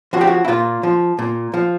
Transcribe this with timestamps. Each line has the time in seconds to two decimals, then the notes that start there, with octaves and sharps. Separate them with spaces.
0.13 F3 F#4
0.21 G4
0.27 F#4
0.45 E4
0.48 A#2 F4
0.83 F3
1.19 A#2
1.54 F3